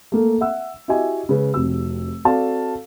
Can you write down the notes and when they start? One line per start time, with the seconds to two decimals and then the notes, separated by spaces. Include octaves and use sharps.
0.12 A3 A#3 A4
0.41 E5 F#5 E6
0.88 E4 F#4 G4 D#5 E5 G#5
1.29 C#3 G#3 C#4 B4
1.54 F1 C3 F#4 E6
2.25 C4 F#4 A4 D5 F5 A5